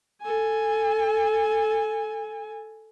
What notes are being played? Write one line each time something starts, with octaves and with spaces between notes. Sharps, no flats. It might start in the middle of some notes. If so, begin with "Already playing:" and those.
A4 G#5